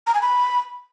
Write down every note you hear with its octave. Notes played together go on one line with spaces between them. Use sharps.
A#5
G#5
B5